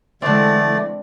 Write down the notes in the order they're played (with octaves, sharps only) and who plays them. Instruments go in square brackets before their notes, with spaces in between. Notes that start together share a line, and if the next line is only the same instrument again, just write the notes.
[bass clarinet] D3 [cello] E3 G#3 [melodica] A3 D5 [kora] C4 D4